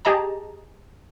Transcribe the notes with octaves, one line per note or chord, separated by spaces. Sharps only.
G4 G#4 D#5 A5 A#5